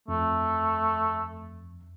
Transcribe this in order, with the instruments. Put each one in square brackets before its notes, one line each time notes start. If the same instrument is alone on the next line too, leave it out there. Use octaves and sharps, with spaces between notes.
[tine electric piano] F2 [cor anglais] A3